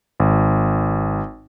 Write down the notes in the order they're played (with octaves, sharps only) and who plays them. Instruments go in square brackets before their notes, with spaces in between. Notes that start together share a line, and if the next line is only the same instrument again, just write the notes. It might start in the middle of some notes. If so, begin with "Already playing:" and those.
[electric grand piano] G#1